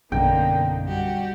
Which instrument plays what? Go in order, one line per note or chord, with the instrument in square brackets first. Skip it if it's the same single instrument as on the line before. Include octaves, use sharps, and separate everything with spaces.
[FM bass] A#1 [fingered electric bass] F#2 B2 C#4 [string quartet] D3 A#3 D#4 [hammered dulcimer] G5
[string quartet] G3 F#4 G4